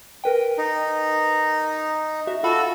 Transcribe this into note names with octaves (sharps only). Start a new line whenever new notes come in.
A#4 B4 G5
D#4
F#4 E5
F4 F#4 A4 F5 B5